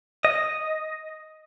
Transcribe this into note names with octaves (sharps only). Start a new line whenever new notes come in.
D#5